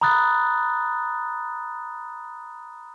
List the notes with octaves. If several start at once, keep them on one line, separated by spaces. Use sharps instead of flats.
A#5 B5 D#6 F#6 A6